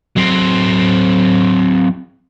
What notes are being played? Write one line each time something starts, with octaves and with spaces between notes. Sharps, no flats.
F#3 C4